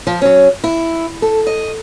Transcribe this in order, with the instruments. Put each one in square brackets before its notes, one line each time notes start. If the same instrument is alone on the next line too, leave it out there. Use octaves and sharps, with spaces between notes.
[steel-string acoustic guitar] F3 F4
F#3 C#4
E4
A4
D#5